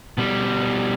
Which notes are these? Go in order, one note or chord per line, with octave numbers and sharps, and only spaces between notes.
B2 G3